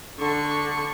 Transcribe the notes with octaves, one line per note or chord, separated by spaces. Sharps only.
D3 C#6